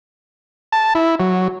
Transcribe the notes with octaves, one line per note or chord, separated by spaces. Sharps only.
A5
E4
F#3